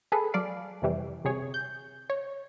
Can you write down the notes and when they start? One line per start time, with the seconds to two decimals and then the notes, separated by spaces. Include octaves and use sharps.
0.12 G#4 A4 B4
0.34 F#3 D5 F5
0.82 F2 C3 E3 G3
1.24 G1 C3 G#4 C#5
1.54 G6
2.10 C#5